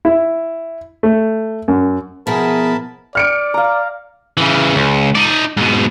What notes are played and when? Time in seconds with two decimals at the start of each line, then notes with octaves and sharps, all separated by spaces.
0.05 E4
1.03 A3
1.68 F#2
2.27 B2 F3 E4 G#4 A#4 A5 B5
3.15 D5 F6 C#7 D7
3.54 F5 A#5
4.37 C#3 E3
4.75 C#2
5.15 D#4 D5
5.57 G#2 B2